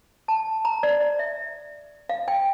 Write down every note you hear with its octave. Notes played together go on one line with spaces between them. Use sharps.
A5
A#5
D5
D5
E5
F5
G5